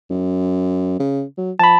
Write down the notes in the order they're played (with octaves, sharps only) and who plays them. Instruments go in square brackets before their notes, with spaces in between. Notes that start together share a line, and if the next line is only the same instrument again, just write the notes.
[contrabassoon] F#2
C#3
F#3
[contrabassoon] F3 [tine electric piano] A5 B5